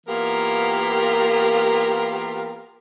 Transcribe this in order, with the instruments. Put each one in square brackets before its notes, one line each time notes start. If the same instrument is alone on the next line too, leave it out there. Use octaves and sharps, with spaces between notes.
[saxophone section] E3 A#3 B3 F4 G4 A#4